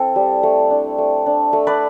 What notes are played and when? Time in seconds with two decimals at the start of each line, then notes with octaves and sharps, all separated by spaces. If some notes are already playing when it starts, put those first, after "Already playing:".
Already playing: C4 E4 A4
0.16 G3
0.43 A3
0.70 D4
0.98 A3
1.26 D4
1.53 A3
1.67 B4 D5